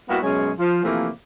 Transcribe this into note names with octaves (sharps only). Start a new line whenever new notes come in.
G3 A#3 B3 E4 F#4
F#2 B2 G#3 C#4 G#4 C#5
F3
C3 E3 F3 A3 A#3